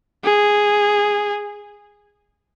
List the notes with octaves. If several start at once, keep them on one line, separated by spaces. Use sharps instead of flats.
G#4